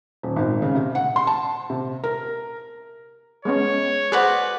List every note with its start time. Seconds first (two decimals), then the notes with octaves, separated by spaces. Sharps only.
0.23 D#1
0.36 G#1
0.62 C#3
0.75 C3
0.95 F#5
1.16 C6
1.27 A5
1.70 C3
2.04 A#4
3.45 G#3 B3 C#4 C#5
4.12 F#4 G#4 B4 C5 D5